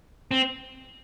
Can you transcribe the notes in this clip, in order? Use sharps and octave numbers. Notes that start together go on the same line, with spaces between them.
C4